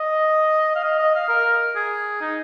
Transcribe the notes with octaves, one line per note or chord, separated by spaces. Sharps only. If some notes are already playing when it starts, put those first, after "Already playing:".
Already playing: D#5
F5
D#5
D#5
F5
A#4
G#4
D#4